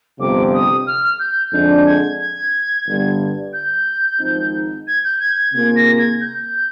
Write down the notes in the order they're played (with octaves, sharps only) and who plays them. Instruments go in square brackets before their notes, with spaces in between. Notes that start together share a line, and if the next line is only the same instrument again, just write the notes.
[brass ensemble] G1 F2 C3 [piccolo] D6
[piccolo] D#6
F6
G6
[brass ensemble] F2 D3 G#3 D4 [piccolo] G6
[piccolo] G#6
G#6
[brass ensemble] G1 G2 D3 G3
[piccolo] G6
[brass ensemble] G#1 G#2 F3 C4 D#4
[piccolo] G#6
G6
G#6
G#6
[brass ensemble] C3 D#3 A#3 F4 G#4 [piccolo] G#6
[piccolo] A#6
G#6
G6